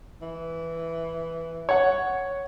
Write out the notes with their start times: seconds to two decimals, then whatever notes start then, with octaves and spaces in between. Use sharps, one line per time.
0.22 E3
1.69 C#5 F#5